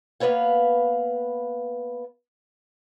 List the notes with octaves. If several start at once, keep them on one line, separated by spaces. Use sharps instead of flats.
A#3 B3 B4 C#5 F5